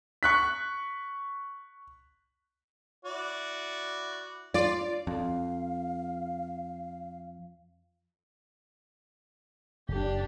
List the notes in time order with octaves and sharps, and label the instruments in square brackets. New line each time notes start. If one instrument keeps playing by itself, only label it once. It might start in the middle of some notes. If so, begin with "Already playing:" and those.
[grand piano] C#6 F#6 B6
[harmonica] E4 F#4 D5
[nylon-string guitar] F4 [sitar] D5
[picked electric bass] F2 [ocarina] F5
[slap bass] F#1 [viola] D4 G4